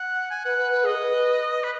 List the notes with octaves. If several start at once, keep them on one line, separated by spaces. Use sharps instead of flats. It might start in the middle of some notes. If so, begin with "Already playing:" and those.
Already playing: F#5
G#5
B4 F#5
B4
B4
G#4 D#5
B4
B4